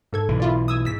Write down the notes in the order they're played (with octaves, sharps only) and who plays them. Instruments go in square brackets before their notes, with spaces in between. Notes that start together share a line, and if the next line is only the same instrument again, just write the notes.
[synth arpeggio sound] G#2 A4 G#6
[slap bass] B1 E3
[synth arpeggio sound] E4 F4 D5
D#6 E6 G#6
[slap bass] G#2 [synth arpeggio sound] E6 B6